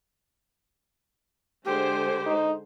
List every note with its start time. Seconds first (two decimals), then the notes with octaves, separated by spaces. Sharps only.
1.65 D3 G#3 G4 C5
2.26 D#4